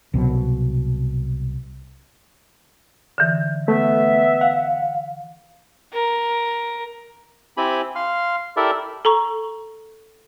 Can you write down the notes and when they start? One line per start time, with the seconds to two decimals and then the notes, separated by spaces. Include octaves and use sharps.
0.14 C2 B2 F#3
3.18 D3 E3
3.68 A3 B3 E5
4.41 F5 F#5
5.93 A#4
7.57 C4 E4 G4 G#5 B5
7.96 F5 C6 F6
8.57 E4 G4 A4 A#4 D5 E5
9.05 A4 A#5 C#6